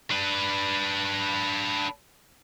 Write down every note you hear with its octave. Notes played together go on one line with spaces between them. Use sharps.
D4 B4